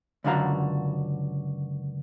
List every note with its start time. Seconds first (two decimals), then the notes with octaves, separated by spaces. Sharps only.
0.24 C#2 F#2 D3 F#4 F5 A#5